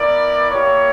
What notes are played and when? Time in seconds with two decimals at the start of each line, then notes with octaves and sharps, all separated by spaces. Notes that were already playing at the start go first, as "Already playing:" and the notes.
Already playing: B3 E4 A#4 D5
0.51 A#3 E4 G4 C#5